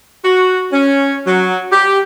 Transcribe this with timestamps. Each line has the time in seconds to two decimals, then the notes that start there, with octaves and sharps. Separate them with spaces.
0.24 F#4
0.72 C#4
1.26 F#3
1.72 G4